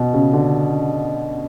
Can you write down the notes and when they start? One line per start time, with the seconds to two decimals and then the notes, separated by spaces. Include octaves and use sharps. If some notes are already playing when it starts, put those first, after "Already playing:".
Already playing: B2
0.14 C#3
0.33 D3